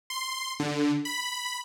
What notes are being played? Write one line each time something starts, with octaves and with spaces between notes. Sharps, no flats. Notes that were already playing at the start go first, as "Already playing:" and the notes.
C6
D3
B5